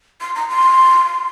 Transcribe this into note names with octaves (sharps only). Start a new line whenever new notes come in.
C6
A#5
C6